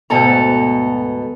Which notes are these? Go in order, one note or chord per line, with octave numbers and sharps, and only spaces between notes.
D2 G#2 B2 B3 A4 A#5